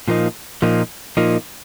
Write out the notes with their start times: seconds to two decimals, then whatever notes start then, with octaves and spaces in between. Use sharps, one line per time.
0.08 A#2 F3 A#3 D#4
0.62 A#2 F3 A#3 D#4
1.17 A#2 F3 A#3 D#4